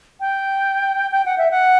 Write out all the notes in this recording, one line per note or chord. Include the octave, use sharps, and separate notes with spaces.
G5
G5
F#5
E5
F#5